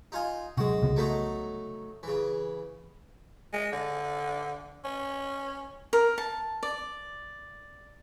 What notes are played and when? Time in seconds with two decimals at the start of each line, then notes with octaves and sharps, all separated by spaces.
0.12 D#4 F4 G#5
0.57 C3 F#3 G#3 F#4
0.82 C2 C#3 B3
0.96 F#3 A3 D#4
2.03 C#3 E3
3.53 G#3
3.72 D3
4.84 C#4
5.93 A#4
6.18 A5
6.63 D5